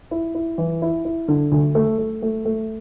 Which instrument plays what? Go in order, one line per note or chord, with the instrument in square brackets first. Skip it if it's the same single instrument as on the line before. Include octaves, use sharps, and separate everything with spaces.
[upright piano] E4
E4
E3
E4
E4
D3
D2
A3
A3
A3
A3